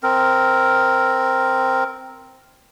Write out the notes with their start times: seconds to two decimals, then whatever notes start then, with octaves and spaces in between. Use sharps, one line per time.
0.03 C4 A#4